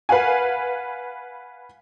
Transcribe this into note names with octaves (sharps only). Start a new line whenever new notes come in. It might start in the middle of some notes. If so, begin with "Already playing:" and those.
B4 F5 F#5 G#5